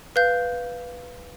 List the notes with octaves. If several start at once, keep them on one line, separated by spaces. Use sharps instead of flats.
B4 F5 G6